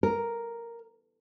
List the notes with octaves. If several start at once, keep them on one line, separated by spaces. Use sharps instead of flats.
A#4